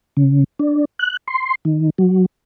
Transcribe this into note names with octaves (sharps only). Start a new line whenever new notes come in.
C#3
D4
F#6
C6
D#3
F#3